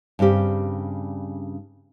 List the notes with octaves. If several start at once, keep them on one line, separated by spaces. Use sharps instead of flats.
G2 C#3 C4 G4